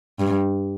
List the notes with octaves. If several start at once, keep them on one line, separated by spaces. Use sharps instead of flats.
G2